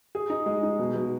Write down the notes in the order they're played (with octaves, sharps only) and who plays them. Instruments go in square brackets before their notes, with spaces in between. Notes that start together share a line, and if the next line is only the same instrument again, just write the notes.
[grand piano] G#4
D#4
G#3
D#4
B2
B2